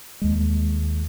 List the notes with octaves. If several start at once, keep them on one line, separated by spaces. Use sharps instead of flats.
D#2 G#3